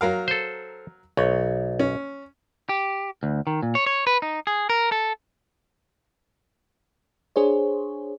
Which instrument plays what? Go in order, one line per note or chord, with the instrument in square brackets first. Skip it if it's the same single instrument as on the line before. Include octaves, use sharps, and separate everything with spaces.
[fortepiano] F#3 A#4 F5
[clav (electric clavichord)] A4 C5
[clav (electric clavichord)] B1 [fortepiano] C#5
[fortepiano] C#4
[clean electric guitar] G4
D2
D#3
A#2
C#5
C#5
B4
D#4
G#4
A#4
A4
[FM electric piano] D4 G#4 C5 C#5